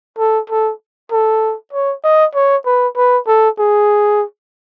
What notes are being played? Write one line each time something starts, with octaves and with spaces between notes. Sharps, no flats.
A4
A4
A4
C#5
D#5
C#5
B4
B4
A4
G#4